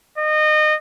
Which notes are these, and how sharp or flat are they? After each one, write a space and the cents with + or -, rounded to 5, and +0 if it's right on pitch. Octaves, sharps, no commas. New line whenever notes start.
D#5 -25